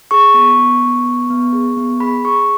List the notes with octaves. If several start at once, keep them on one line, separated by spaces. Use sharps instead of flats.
G#4 C#6
B3
B3
B3
B3
B3
G#4
B3
G#4 B5
G#4 C#6